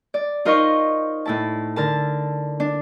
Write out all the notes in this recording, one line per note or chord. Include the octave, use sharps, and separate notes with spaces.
D5
D#4 F4 A#4 C5 D#5 C#6
A2 E4 A5
D3 A#4 A5
D4